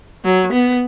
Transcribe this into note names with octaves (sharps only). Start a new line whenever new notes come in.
F#3
B3